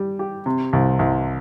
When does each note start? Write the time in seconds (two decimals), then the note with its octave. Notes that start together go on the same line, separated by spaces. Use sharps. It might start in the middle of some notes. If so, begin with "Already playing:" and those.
Already playing: G3
0.19 G4
0.46 C3
0.73 C2
0.99 C2